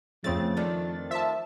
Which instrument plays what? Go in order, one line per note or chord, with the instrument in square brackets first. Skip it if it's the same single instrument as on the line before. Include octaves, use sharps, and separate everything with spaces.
[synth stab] F2 C4 A6 [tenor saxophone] C#3 [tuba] F3 [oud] A3
[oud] D#3 A3 [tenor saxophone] D4
[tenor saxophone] F3 [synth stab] E5 A5